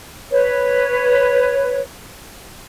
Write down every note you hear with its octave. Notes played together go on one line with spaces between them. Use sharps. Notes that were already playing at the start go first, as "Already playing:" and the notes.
B4 C#5